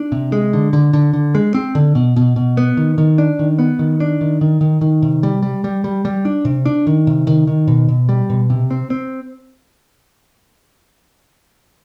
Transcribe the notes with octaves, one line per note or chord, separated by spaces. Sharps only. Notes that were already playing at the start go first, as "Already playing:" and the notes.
Already playing: D4
C3
G#3
D3
D3
D3
D3
G#3
C4
D3
B2
B2
B2
B3
D#3
D#3
D4
D#3
B3
D#3
D4
D#3
D#3
D#3
D#3
C3
G3
G3
G3
G3
G3
D4
C3
D4
D#3
C3
D#3
D#3
B2
B2
G3
B2
C3
C4
C4